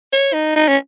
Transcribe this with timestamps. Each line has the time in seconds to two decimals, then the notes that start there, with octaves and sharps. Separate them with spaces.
0.13 C#5
0.33 D#4
0.56 D#4
0.68 C#4